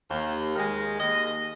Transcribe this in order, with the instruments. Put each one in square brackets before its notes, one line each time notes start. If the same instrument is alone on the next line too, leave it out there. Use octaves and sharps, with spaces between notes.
[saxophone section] D#2
D#3 G#3
D#2 D#5